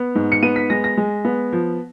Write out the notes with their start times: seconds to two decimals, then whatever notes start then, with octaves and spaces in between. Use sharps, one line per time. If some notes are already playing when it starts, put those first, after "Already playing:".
Already playing: B3
0.15 G#2
0.32 C#7
0.43 B3 D#7
0.56 B6
0.70 G#3 A#6
0.84 A#6
0.97 G#3
1.25 B3
1.53 F3